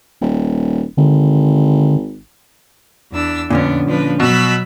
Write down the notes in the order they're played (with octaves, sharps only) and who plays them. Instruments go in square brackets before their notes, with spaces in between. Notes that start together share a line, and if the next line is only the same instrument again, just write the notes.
[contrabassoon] D#1
[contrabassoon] G#1 [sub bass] D3
[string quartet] E2 D4 E6
[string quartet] F2 B3 D4 [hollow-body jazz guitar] A#2 D3 C#4
[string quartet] F3 D4 B4
[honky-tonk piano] B2 [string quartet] F#3 B5 E6